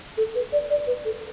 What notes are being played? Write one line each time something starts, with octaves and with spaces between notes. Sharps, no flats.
A4
B4
D5
D5
B4
A4